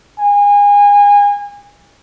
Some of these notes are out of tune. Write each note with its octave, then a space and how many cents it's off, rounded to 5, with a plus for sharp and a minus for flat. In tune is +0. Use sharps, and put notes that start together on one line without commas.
G#5 -30